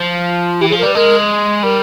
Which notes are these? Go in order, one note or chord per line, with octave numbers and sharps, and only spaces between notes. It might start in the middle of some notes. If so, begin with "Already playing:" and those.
Already playing: F3
E3 G4
G#4
F3
A#4
G3 B4
G#3 A#4
G3 A#4